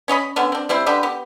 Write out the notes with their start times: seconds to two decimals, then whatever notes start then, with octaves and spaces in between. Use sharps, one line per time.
0.08 C#4 C#5 D#5 B5
0.36 D3 B3 C#4
0.52 C4 D4
0.69 G3 C4 E4 C5
0.86 D3 G3 G4 B4
1.03 B3 G4